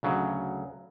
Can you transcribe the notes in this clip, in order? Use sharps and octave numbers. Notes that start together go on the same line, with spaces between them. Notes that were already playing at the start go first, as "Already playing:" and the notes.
D2 C#3 F#3